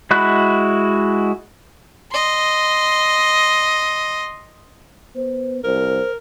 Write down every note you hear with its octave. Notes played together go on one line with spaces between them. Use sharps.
G#3 E4 F#4 B5 F#6
D#5 C6
B3 C5
C2 A#4 C5